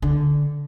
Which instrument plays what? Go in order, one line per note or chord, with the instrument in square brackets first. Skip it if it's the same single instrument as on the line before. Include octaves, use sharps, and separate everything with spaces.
[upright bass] D3